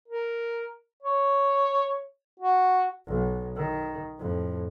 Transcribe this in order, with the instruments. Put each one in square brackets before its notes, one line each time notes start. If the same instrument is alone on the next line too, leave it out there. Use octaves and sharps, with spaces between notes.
[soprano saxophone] A#4
C#5
F#4
[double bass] B1
D#3
F2 A2